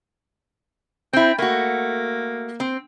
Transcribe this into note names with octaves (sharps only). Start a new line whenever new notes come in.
C4 E4 G5
A3 A#3 F#4
C4